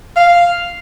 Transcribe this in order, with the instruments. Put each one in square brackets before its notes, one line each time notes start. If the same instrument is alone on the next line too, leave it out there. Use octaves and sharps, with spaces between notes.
[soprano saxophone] F5